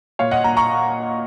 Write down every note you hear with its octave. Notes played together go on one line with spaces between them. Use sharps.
A#2 C#5 F5
D#5 F#5
A#2 F#5 A#5
A#5 C#6